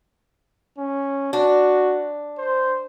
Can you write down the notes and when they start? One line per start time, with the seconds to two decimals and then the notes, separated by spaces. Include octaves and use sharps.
0.78 C#4
1.33 D4 F#4
2.38 C5